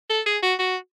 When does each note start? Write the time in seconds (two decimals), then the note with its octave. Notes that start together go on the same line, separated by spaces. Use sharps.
0.10 A4
0.26 G#4
0.43 F#4
0.59 F#4